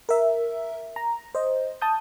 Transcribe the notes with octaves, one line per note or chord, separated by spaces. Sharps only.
A#4 E5
A#5
C5 D#5
A5 D#6 G6